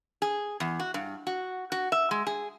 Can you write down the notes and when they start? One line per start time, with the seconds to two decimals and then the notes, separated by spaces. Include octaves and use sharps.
0.22 G#4
0.60 E2
0.80 F#4
0.94 G2
1.27 F#4
1.72 F#4
1.92 E5
2.11 G#3
2.27 G#4